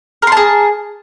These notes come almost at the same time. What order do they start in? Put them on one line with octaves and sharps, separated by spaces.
A#4 C6 A5 G#4